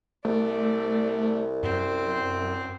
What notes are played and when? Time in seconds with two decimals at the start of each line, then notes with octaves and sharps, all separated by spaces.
0.25 C2 A3 D5
1.63 F#2 C4